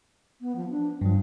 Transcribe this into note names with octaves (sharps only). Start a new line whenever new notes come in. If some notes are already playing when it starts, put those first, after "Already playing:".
B3
F3
D4
G2 F3 F#3